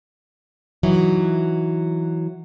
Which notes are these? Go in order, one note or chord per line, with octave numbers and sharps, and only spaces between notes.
E3 F#3 D#4